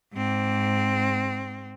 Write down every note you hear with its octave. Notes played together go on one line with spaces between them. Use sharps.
G#2 C4